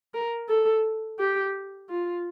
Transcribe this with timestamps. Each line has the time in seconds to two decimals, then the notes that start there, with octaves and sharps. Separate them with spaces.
0.14 A#4
0.49 A4
1.19 G4
1.89 F4